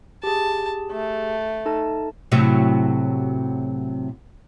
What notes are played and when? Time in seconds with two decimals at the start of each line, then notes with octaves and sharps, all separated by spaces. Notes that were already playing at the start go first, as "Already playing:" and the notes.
0.23 G4 G#4 A5
0.91 A3
1.66 D#4 A4 A5
2.32 A2 C3 F#3